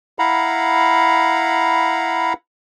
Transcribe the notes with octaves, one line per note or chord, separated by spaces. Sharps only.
E4 F5 F#5 A#5 B5